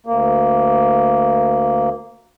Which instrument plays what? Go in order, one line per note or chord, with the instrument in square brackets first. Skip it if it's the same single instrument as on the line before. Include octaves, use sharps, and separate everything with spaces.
[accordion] D2 A#3